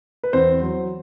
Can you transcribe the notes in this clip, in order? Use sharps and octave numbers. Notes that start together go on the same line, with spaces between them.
B4
E2 C4 C5
F#3